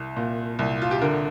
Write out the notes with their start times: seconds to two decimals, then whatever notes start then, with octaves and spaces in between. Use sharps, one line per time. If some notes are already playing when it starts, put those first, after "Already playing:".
Already playing: C2
0.16 A#2
0.59 C2
0.82 F4
0.91 G4
1.02 D3 A#4